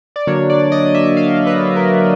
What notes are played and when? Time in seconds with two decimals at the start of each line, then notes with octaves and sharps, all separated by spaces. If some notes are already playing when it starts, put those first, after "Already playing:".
0.16 D5
0.27 D3 F#3 A#3 D4 C#5
0.50 D5
0.72 D#5
0.94 E5
1.17 F5
1.47 B4
1.76 A#4